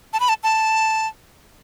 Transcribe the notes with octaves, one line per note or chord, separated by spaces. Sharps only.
A5
B5
A5
A5